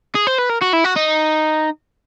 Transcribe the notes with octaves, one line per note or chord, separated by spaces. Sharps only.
G#4
C5
B4
A#4
F#4
E4
F#4
D#4